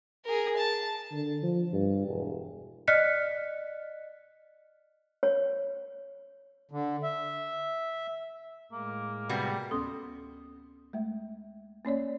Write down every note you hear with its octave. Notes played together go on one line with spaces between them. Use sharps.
G#4 A#4
A5
D3
F3
G2
E1
D5 D#5 F6 F#6 B6 C#7
C#5
D3
E5
A2 G#3 A#3
C3 G3 B3 F#4
D2 B3 C#4 A4 C6 D#6
G#3 A3 E5
A#3 C#4 C#5 D5